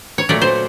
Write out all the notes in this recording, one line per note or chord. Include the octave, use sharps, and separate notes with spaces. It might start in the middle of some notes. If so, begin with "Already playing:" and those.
C#5
A#2 F#3 A3 D5
C5